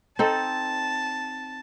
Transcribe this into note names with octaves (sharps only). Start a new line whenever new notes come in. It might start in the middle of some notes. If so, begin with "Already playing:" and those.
C4 D#4 A4 A5